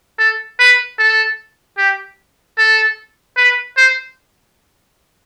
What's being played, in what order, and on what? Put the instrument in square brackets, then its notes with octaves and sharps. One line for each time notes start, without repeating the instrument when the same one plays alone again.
[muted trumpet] A4
B4
A4
G4
A4
B4
C5